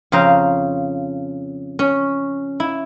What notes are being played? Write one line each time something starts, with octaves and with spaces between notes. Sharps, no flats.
F2 C#3 C5 F5 A#5
C#4
E4